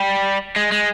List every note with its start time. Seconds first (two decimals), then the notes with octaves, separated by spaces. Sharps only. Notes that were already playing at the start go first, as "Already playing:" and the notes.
Already playing: G3
0.56 G#3
0.72 G#3